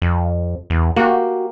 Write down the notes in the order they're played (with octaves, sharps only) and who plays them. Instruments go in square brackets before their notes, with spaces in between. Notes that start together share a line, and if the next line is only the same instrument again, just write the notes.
[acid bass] F2
E2
[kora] A#3 G4 [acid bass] F#4